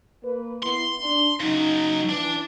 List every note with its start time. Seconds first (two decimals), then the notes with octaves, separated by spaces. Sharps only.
0.23 A#3 B4
0.63 B3 E4 C6
0.99 D4
1.40 C#3 F#3 D#4
2.09 E3 D4